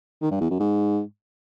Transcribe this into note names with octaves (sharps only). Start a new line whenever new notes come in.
D#3
G2
E2
F#2
G#2